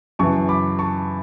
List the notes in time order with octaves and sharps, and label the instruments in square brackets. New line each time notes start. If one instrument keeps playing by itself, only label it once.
[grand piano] F#2 C#3 E3 A5 C#6
B5 D6
A5 C#6